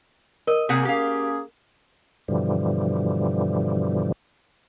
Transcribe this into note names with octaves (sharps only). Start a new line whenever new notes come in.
A#4 D#5
C3 A#3 G#4 F#5
A#3 C#4 G4 G#4 F5
G2 B2 D3 E3 F3 G3